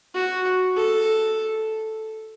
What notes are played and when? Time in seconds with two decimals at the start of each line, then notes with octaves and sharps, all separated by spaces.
0.15 F#4
0.77 A4